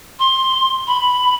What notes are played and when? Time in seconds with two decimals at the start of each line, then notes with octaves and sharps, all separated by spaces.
0.19 C6
0.87 B5